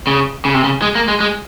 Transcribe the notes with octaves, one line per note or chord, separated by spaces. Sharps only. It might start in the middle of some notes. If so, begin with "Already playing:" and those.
C#3
C#3
C3
C#3
G#3
A#3
G#3
G#3